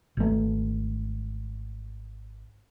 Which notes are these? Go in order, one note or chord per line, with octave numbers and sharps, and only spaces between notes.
G#1 A3